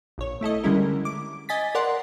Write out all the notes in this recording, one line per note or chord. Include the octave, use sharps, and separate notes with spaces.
A#1 C#5
A3 E4 A4 D#5
D3 G3 G#3 C#4 E4 A#4
D6
D#5 G#5 A6 B6
A#4 D5 F#5 C6